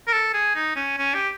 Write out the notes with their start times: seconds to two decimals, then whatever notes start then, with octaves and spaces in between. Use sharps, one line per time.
0.08 A#4
0.13 A4
0.34 G#4
0.55 D#4
0.76 C#4
0.98 C#4
1.14 G4